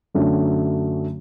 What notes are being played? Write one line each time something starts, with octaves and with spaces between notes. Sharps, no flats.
F#2 D3 F#3 A3 D4